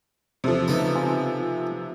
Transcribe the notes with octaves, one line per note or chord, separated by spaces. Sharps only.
E2 C3 F3 A4
C#3 A3 B3 D#4
C4 F4 G#5